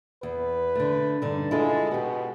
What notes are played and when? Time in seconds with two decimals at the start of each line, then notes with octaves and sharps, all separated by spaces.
0.23 E2 B4
0.75 D3 A3
1.22 G2 D3 D#4
1.51 G#3 E4 F4 A4
1.91 B2 F#4 G4